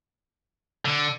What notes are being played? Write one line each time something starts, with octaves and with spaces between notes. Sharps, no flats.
D3